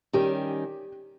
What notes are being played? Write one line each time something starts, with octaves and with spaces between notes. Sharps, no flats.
D#3 G3 C#4 G4